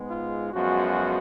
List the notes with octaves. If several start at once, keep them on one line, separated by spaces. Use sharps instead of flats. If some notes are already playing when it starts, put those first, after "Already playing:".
Already playing: G#2 G#3 B3
F4
F#2 F3 G#3 B3 F#4